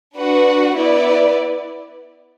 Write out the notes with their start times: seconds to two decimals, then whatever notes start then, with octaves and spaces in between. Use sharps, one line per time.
0.16 D4 F#4 B4 F#5
0.76 B3 E4 B4 D5